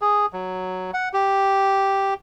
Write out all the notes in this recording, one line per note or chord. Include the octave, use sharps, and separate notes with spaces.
G#4
F#3
F#5
G4